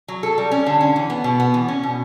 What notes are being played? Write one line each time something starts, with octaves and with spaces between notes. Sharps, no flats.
F#3
A4
G3
C#4
D3
C#4
E3
B3
B2
B3
E3
C#4
B2